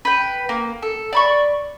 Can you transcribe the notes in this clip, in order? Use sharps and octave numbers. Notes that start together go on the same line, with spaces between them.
B4 G5
A#3
A4
D5 B5 C#6